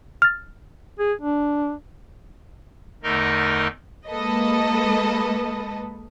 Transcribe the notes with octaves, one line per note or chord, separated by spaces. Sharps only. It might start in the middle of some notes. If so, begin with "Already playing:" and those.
F6 A6
G#4
D4
E2 D3 A3 D#4 A#4 D#5
G#3 A#3 A4 B4 D#5